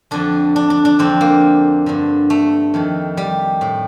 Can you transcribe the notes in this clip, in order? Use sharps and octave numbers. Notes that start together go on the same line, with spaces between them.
F2 D3 D4
D4
D4
D4
F2 D3 C4
A#3
G2 D3
A3
F2 D#3
G3
A2